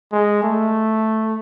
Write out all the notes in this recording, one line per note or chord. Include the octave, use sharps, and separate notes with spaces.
G#3
A3